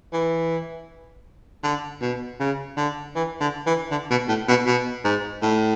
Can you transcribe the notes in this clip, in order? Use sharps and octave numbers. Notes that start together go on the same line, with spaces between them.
E3
D3
B2
C#3
D3
E3
D3
E3
D3
B2
A2
B2
B2
G#2
A2